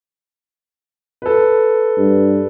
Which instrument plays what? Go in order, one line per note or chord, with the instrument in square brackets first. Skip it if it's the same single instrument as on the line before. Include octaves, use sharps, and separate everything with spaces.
[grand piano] A4 B4
[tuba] G2